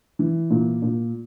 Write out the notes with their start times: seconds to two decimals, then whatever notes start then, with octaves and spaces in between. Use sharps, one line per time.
0.19 E3
0.50 A#2
0.82 A#2